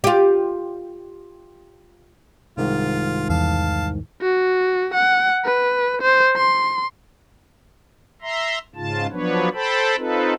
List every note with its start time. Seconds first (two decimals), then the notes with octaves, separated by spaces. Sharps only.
0.04 F4 G4
2.57 C2 G#2 D#3 F4
3.29 E2 F5 A5
4.22 F#4
4.94 F#5
5.45 B4
6.02 C5
6.36 C6
8.22 E5 A#5 C6
8.75 G#2 C#3 F4 A5
9.11 F3 F#3 B3 D4 B4 C#5
9.54 A4 C5 G5 A5 B5
9.97 C4 D#4 F4 A4 B4